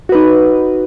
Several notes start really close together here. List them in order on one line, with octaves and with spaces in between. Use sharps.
F#4 B4 D#4